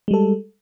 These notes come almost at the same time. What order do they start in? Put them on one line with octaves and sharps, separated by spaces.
G#3 G3 A4